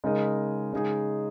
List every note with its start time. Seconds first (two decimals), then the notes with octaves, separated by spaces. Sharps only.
0.04 C#3 G#3 D#4 A#4 D#5
0.73 C#3 G#3 D#4 G#4